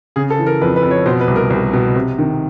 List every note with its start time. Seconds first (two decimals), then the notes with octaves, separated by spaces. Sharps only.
0.16 C#3 G#4
0.30 A4
0.39 E3
0.46 A#4
0.62 F2 B4
0.76 B4
0.83 F2
0.91 C#5
1.06 B2 C5
1.21 B4
1.28 C2
1.36 A#4
1.50 C2
1.73 B2
1.96 C3
2.18 D#3